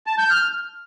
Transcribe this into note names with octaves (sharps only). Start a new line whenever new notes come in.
A5
G6
F6